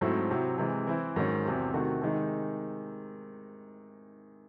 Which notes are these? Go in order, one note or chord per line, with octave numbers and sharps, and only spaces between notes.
G#2 F#3 A3 C4 E4
C3 F#3 C4 E4
C3 E3 G#3
E3 C4 E4
G#2 D#3 F#3 C#4
E2 C3 F#3 C4
C3 D#3 A3 C4 F#4
C3 D#3 G#3 D#4